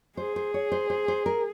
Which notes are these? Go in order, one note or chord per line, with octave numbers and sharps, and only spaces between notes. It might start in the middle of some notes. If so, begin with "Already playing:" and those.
G#4 C5
C5
C#5
C5
C5
C5
A#4